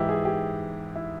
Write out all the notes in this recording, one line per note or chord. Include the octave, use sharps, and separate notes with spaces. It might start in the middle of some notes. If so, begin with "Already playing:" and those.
Already playing: G#2 E3 D#4 E4 G4
G#4
G4
E4